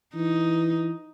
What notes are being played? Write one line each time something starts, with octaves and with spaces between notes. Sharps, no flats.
E3 D#4